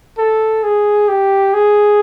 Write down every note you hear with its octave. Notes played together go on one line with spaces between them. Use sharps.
A4
G#4
G4
G#4